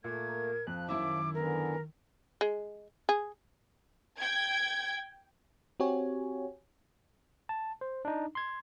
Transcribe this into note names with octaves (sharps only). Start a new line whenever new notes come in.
A#2 A3 A#3 G#6
A#4
F2 F3 F#6
F#2 D#3 E4 E5 D6
D3 E3 B3 A#4
G#3
G#4
G5 G#6
C4 F#4 G4 C#5 G#5
A5
C5
D4 D#4
C6 G#6